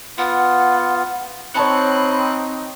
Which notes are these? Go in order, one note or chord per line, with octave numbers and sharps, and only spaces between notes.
B3 F4 F#5
C4 D#4 C#5 A5 B5 F#6 C#7